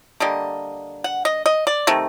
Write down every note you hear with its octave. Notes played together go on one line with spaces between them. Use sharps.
D3 G3 A#3 D#5
F#5
D#5
D#5
D5
C3 D#3 A3